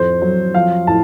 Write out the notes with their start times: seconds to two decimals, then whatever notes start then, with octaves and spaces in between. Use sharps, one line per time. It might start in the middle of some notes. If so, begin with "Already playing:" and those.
Already playing: F2 A2 C5
0.22 F#3
0.54 F3 F5
0.87 A2 A5